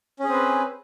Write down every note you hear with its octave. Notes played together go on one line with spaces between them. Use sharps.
C4 C#4 G#4 B4